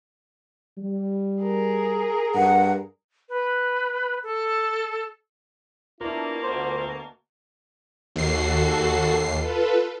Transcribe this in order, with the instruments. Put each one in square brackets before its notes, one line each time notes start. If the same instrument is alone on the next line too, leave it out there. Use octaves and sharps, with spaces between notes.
[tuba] G3
[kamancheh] G#4 A#4
[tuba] G2 [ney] F#5
[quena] B4
A4
[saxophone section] B2 A#3 [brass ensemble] D4 E4 [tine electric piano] F4 A#4
[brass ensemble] D2 [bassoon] C5
[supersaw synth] D#2 C7 [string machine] F#4 A4
[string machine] F4 A4 B4